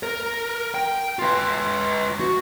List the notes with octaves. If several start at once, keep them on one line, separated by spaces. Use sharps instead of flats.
A#4
G5
F4 B4
F#4